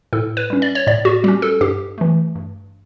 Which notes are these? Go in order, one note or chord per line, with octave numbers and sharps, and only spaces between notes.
A2 A4
B4
G3 C#4
D5
C#5
A2 D5
F#4
G3 C#4 G4
A4
G2 G4
E3 A3
G2